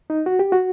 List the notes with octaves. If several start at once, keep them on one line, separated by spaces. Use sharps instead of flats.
D#4
F#4
G4
F#4